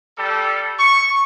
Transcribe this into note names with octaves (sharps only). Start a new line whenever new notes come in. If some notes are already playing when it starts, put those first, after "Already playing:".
G3 A4
C#6